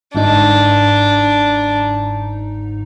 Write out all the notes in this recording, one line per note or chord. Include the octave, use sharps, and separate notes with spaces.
G1 G#2 D4 D#4